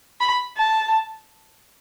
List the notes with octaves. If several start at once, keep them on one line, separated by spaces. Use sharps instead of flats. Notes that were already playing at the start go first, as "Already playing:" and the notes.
B5
A5